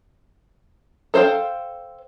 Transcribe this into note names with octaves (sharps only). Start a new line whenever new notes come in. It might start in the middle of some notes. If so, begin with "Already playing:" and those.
A4 C5 F5 G5